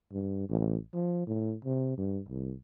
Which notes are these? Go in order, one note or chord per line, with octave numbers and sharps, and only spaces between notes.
G2
A1
F3
A2
C3
G2
C2